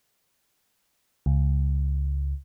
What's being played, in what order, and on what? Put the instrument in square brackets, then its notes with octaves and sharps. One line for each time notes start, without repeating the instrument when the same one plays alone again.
[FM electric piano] C#2